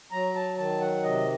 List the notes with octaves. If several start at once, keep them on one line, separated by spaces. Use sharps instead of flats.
F#3 A#5
A5
D#3 A5
F#5
C3 D#5